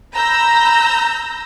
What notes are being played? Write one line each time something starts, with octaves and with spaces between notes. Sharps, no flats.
A#5 B5 E6 G6 A#6